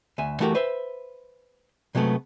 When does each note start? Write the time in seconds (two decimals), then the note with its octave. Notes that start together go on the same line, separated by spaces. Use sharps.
0.18 D2 E5 G#5
0.40 E3 A3 F#4 G4 A4 A#4
0.55 B4 C5 E5
1.95 C3 F#3 G#3 A3 B3